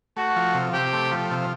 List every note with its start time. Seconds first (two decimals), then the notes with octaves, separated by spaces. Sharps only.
0.17 A3 F#4
0.36 F3
0.54 C3
0.73 C3 G4
0.93 A3
1.11 F3
1.31 C3